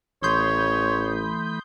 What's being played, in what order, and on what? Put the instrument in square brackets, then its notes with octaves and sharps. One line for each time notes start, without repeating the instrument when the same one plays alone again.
[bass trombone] A1 [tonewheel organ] E3 A3 B5 [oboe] C#5 [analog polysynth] C6 D#6 G6